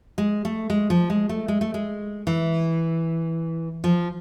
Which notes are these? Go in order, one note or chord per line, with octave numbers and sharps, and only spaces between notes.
G#3
A3
G#3
F3
G#3
A3
G#3
A3
G#3
E3
F3